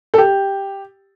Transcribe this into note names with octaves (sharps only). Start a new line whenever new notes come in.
A4
G4